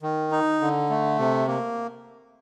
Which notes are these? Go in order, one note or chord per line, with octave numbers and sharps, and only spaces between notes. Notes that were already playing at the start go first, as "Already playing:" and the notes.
D#3
D#4
D3
A3
C3
A#3